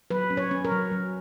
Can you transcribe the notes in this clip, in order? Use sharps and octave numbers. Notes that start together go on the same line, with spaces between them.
F#3 B4
C#4
C#5
C#4
A#4
F#3
F#3